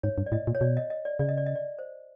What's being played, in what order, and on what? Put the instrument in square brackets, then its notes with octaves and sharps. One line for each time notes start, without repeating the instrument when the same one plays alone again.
[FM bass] G#2 [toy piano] C#5
[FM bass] G2
[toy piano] D5
[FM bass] A2 [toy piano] D#5
[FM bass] A#2
[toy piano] C#5
[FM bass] B2 [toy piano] D5
[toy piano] D#5
D#5
D5
[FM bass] C#3 [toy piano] D5
[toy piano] D#5
D5
D#5
D5
C5